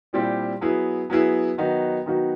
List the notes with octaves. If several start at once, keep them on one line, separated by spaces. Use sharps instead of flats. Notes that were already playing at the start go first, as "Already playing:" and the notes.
A#2 G3 C4 E4 G4
F#3 B3 E4 G#4
F#3 B3 E4 G#4
D#3 F#3 B3 D#4 F#4
D#3 F#3 B3 D#4 F#4